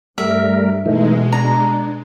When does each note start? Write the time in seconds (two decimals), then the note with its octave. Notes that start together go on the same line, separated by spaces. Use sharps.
0.18 G2 G3 A3 A#4 E5
0.86 B2 E3 G#3 A3 D#4
1.32 D4 A#5